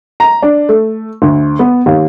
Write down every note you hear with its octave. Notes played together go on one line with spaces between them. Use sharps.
A#5
D4
A3
D2
B3
D#2